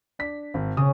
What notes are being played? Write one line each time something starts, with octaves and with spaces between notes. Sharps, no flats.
D4 B6
G#1
C#3 D#6